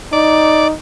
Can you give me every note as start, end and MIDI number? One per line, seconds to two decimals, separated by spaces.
0.13 0.72 63
0.13 0.68 74